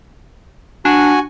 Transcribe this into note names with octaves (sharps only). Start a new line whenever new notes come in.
D4 F#4 G#5